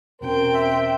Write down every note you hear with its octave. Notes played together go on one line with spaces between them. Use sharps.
E2 B2 C4 C#4 A#4 G5
E5